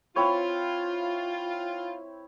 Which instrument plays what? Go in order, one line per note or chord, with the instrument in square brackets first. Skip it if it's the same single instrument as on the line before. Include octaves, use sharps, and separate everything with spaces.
[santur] C4 E4 C#5 [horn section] F4